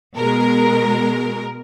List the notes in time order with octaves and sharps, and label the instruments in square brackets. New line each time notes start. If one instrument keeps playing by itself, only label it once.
[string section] B2 G#3 A#4